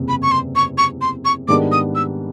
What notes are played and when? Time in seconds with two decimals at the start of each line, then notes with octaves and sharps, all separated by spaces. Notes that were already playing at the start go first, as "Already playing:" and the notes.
Already playing: F#1 E2 C3
0.08 B5
0.22 C#6
0.31 C6
0.56 C#6
0.78 C#6
1.01 C6
1.25 C#6
1.48 G#2 D#3 G3 B3 D4 D6
1.72 D#6
1.95 E6